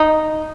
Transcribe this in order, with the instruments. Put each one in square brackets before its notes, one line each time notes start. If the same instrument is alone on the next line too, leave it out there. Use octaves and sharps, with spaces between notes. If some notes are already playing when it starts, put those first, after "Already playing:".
Already playing: [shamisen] D#4